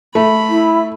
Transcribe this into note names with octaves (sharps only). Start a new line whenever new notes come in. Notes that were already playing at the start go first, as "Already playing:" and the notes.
A3 B5
E4